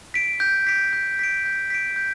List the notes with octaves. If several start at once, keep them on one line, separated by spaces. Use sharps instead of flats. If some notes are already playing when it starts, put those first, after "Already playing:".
B6 D7
G6
B6 D7
G6
B6 D7
G6
B6 D7
G6